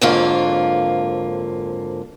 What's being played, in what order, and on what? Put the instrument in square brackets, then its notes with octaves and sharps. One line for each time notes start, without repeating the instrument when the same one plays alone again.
[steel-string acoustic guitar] F2 G#2 D3 F#3 A#3 F4